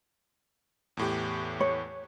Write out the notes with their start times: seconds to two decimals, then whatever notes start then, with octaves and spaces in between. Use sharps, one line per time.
0.97 E2 A2 G4
1.60 C#5